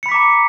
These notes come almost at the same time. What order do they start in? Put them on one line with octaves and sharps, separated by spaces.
C#7 B5 B6 D6 A#5